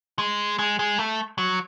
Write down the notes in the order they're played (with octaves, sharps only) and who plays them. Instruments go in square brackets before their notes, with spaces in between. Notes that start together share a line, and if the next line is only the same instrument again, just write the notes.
[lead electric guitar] G#3
G#3
G#3
A3
F#3